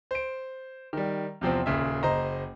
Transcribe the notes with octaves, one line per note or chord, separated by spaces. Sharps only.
C5 D7
D#3 G3
E2 C3 F3 C4
D#1 A#2 C#3 E5
F#1 C5 D#5 A#5